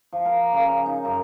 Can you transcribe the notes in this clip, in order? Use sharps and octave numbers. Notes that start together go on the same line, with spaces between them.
F3
A#4
C#3
D#4
F#2